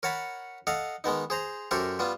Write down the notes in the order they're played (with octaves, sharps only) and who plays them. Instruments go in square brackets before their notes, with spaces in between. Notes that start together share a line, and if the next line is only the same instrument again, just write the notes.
[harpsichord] A#4 C#5 F#5 A5 B5
A4 D#5 F5 F#5
D#3 G#3 B3 D#4
G#4 C5 A#5
F#2 G4 A4 A#4 C5 C#6
G3 B3 F4